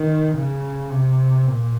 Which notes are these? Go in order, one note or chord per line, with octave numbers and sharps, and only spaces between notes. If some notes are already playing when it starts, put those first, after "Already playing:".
Already playing: D#3
C#3
C3
A#2